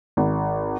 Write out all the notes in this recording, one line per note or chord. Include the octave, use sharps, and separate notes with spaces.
G#1